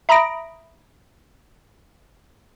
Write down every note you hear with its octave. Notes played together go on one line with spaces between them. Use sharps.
E5 A#5 B5 D#6 A#6 D7